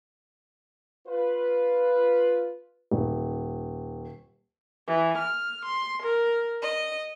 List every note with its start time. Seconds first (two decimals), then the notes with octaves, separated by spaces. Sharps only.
1.08 F4 B4
2.91 D#1
4.87 E3
5.18 F6
5.64 C6
6.03 A#4
6.64 D#5